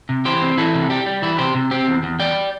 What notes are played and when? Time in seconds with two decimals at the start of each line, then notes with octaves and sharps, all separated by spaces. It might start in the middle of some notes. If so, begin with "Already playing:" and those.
0.09 C3
0.25 E3 G4 C5
0.42 C4
0.57 E3 E4 A4
0.74 C3
0.90 G3 G4
1.06 G3
1.22 E3 E4
1.38 C3 G4 C5
1.55 C3
1.71 C4 G4
1.88 E2
2.03 E2
2.19 E2 D5 G5